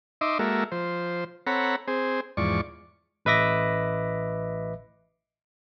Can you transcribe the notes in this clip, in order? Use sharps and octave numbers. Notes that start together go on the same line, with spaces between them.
D#4 D#5 E5 C6 D6
G#3 A#3 F#4 A4 A#4 E5
F3 C5
C4 A4 C#5 F#5 A#5 B5
C4 G#4 C5
E2 G#2 F3 D5 C#6
A1 B4 D#5 E5 D6 A#6